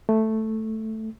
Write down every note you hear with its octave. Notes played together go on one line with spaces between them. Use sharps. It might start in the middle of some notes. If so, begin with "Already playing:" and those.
A3